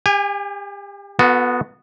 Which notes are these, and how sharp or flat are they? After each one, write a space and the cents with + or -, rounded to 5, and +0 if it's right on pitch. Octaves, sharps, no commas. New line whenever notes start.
G4 +35 G#5 -25
B3 +0 F#4 -35 A4 +25